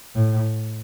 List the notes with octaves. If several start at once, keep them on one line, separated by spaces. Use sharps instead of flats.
A2